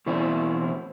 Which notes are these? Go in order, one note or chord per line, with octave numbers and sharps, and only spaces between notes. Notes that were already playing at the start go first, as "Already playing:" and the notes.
B2 E3 C4 E4